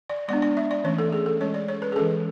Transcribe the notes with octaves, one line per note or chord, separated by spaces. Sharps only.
D5
G#3 B3 D4 D5
D5
E5
D5
E3 A3 C#4 C#5
A4
G#4
A4
G#3 C#4 C#5
D5
C#5
B4
G#4
E3 G#3 C#4 A4